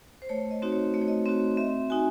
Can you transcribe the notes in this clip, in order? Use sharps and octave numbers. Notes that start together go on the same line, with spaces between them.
C5
A3 C#5
D#5
C4 D#4 F#4
C#5
A3 D#5
C#5
D#5
C4 D#4 F#4 D#5
C4 E5
D#4 F#4 G#5